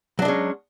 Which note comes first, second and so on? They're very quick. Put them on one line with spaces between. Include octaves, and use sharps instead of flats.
F#3 D4 G#3 C#4